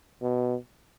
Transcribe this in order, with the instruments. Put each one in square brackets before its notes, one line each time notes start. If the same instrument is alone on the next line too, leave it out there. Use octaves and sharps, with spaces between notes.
[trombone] B2